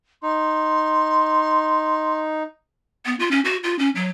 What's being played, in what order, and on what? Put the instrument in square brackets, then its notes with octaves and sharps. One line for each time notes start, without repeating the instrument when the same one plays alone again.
[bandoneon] D#4 [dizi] C6
[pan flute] B3
F4
C#4
F#4
F4
C#4
F#3